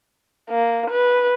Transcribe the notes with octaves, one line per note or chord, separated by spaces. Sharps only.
A#3
B4